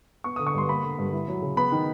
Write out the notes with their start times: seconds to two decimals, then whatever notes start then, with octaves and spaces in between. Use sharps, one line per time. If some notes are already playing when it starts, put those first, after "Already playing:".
0.24 B3 C#6
0.36 D3 D#6
0.47 C#6
0.54 G2 C6
0.69 A#3 B5
0.83 D3
0.98 G2
1.13 E4
1.28 F#3
1.42 C#3
1.57 B3 B5
1.72 D#3